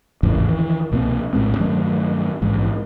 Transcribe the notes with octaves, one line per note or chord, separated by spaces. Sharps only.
G#1 E2 A2 C#3
D#3 E3
C2 B2 A#3 C4
A#1 A2 G#3 C4
G2 D#3 F#3 A3
A#1 G#2 E3